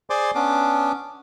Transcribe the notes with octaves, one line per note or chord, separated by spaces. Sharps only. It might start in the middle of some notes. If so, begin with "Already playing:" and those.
G#4 C5 D5 G#5 C6 D6
B3 C#4 D4 D6